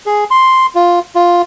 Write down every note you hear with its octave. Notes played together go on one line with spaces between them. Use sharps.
G#4
C6
F4
F4